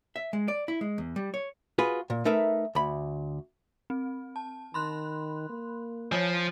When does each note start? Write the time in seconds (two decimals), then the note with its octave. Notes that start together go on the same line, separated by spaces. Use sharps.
0.16 E5
0.33 G#3
0.48 D5
0.68 E4
0.81 G#3
0.98 E2
1.16 G3
1.34 C#5
1.79 F4 F#4 G#4 B4
2.10 A#2
2.25 A3 D#4 A#4 B4 E5
2.75 D2 B5
3.90 C4
4.36 A5
4.74 D#3 B5 C6 F#6
5.49 A#3
6.12 F3 C#5 G#5